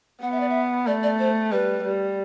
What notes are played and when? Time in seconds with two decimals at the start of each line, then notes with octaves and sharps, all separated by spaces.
0.22 B3 F#5
0.32 E5
0.40 D5
0.49 E5
0.87 A3 D5
1.03 D5
1.19 C5
1.51 G3 B4
1.84 G3